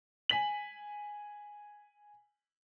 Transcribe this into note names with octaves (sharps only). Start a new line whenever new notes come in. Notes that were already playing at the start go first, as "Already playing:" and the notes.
G#5 B6 F#7